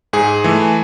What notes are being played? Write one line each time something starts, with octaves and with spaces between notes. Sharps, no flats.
G#2 G#4
E3 A3